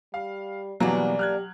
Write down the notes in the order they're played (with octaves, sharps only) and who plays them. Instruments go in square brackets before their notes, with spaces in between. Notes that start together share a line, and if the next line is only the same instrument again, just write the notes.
[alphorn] G3 [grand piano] F5
[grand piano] B2 E3 G3 [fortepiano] F#3 [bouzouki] A#3 D4 [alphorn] B3
[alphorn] G4 [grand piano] F6 F#6 G#6